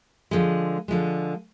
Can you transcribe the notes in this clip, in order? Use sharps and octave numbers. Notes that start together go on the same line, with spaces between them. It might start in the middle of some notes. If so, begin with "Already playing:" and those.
D3 F3 G#3
D3 F3 G#3